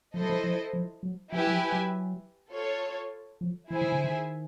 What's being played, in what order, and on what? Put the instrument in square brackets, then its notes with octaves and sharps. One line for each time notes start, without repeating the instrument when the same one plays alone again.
[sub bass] F3 [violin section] E4 A4 C5 D#5
[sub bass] F#3
F3
F3
F3
F#3
[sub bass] F3 [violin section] E4 G4 B4 E5 G#5
[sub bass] F#3
F3
F#3
[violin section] F4 A4 C#5
[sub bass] F3
[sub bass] E3 [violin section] E4 G#4 C5 E5 G#5
[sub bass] D#3
D3
D#3